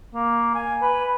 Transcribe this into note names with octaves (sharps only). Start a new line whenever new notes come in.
A#3
G#5
B4